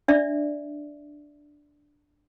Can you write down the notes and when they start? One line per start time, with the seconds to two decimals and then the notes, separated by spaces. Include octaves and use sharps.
0.08 D4 D5 E5